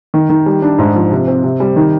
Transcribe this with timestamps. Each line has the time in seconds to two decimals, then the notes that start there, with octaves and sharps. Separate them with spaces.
0.14 D#3
0.30 D#3
0.46 G3
0.62 D4
0.79 G#2
0.95 F3
1.11 C3
1.27 C4
1.44 C3
1.60 G3
1.76 D#3